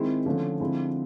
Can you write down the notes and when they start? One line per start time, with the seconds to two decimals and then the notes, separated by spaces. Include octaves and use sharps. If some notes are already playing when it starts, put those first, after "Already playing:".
Already playing: D#3 G#3 C4 E4
0.26 D3 F3 A3 C#4
0.60 D3 F3 G#3 C4 E4